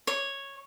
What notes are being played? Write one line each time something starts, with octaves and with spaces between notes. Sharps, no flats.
C#5